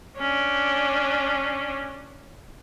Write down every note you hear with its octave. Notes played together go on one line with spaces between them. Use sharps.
C#4 D4